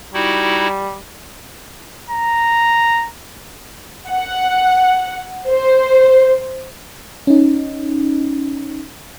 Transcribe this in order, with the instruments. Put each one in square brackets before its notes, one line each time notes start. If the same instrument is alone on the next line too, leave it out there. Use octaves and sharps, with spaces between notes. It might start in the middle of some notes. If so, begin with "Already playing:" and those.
[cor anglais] G3 [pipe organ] D#4 E4 F#4
[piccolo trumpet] A#5
[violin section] F#5
C5
[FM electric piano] C#4 D#4